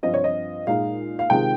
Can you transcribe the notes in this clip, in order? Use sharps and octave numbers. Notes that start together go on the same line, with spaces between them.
G2 F3 C4 F4 D#5
C#5
D#5
A#2 G#3 D#4 F5
F5
C3 D#3 G#3 C4 F4 G5